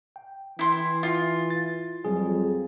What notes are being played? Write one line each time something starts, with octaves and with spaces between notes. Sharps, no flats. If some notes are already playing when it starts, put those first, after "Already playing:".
G5
E3 E4 C6
F4 E5
A6
F2 F#3 G3 G#4